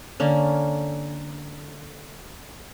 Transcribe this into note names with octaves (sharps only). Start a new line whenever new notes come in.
D3 A#3 C#4